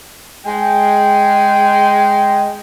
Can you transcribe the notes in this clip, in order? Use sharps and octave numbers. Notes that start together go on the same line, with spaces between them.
G#3 G5